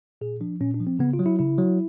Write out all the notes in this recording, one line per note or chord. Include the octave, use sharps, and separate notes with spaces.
A#2 G#4
F3 D4
A#2 C#4
D4
F3
C4
C#3 B3
F4
F#3
E4
C#3 E4
F#3